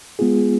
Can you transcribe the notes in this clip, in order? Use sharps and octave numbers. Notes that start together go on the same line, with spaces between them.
G#3 B3 F4 G#4